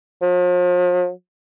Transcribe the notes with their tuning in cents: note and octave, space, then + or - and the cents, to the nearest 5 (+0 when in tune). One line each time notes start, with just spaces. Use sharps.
F3 +40